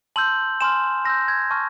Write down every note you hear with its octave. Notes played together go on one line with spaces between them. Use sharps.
A5 C6 E6 G6 F#7
G#5 C6 F6 E7
C6 E6 G6 A#6
G#6
A5 C#6 F6